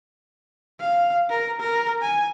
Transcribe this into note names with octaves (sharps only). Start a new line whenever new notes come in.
F5
A#4
A#4
G#5